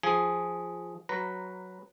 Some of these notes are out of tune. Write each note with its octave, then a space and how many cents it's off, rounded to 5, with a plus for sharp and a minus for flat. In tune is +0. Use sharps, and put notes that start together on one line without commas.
F3 +0 G#4 +0
F#3 +0 B4 +0 A#5 +0